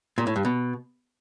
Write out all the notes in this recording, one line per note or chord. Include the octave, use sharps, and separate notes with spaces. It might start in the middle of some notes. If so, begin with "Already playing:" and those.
A#2
A2
G2
B2